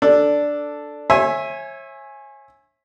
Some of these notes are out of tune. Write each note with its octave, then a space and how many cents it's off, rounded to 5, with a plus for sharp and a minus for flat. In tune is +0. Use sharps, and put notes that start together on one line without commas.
D4 +0 A4 +0
C#5 -35 E5 +0 G#5 +0